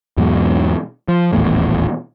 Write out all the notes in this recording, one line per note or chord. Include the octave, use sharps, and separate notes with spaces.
E2 G#2 B2 F#3
F3
D#1 A1 E2 A2